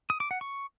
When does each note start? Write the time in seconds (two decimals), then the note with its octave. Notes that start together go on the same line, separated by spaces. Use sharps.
0.10 D#6
0.20 D6
0.31 F#5
0.41 C#6